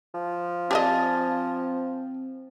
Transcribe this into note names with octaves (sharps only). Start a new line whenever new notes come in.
F3
C4 G4 D5 D#5 F5 G#5 A5